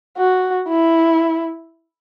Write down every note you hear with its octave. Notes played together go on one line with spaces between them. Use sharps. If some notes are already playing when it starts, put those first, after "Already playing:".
F#4
E4